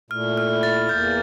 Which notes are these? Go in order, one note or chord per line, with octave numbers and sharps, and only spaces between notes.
A#2 A3 E4 F6
F6
A6
E2 E3 A#3 G6